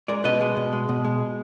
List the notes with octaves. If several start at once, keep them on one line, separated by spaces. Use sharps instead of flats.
G#3 A#4 D5
B2 B4 D#5
G#3
B2
G#3
B2
G#3